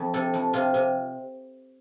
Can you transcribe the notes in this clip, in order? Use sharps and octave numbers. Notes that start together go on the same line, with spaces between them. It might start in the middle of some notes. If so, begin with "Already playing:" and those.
Already playing: F2 F3
C3 A4
F2
C3 F4
C3